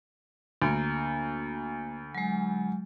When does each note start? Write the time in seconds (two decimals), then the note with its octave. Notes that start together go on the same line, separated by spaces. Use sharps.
0.62 D2 A#3
2.15 F#3 G#3